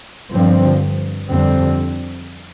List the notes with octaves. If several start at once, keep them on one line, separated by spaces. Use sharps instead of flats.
G2 D3 F3 C4
F2 D3 G3 C4